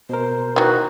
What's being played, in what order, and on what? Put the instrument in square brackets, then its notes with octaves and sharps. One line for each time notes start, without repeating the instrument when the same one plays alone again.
[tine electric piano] B2 A#4 [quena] C5
[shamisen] D#3 E3 [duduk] F#4